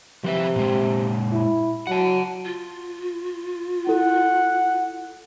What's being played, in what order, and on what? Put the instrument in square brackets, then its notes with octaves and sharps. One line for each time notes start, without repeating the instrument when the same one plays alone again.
[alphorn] C3 [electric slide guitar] F3 B4 E5
[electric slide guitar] A#2 G#3
[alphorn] E4
[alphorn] F#3 [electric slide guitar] F#5 A5
[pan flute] F4
[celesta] E4 A4 [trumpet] F#5